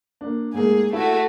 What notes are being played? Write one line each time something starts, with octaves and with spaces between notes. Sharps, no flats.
A#3 D4
G#2 A3 A#3 G#4
A3 E4 F#4